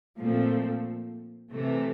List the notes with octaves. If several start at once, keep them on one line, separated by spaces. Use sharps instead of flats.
A#2 F3 A3 C4
C3 E3 A3